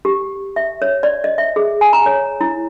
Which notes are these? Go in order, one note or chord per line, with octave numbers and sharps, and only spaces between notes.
G4
E5
C#5
D5
D#5
E5
G#4
G#5
A#5
C#5
E4